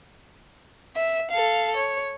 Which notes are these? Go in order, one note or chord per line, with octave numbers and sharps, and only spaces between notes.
E5
A4 F5
C#5